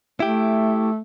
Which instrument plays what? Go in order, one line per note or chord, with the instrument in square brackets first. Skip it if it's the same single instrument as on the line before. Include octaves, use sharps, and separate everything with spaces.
[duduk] A3 [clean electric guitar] E4 G4